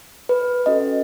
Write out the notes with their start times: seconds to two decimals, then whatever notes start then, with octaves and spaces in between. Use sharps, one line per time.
0.29 B4
0.66 C#4 F#4 A4 D#5